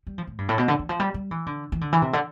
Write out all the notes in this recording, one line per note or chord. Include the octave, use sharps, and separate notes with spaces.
G3
F3
A2
G2
A2
B2
D3
E3
F3
G3
G3
E3
D3
E3
D3
E3
C3
D3